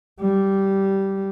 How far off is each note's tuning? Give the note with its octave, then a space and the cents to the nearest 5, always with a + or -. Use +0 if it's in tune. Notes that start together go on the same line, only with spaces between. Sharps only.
G3 -10